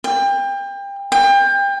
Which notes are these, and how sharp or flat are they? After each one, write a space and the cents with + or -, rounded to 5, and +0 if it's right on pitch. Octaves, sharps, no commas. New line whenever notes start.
G5 +30
G5 +30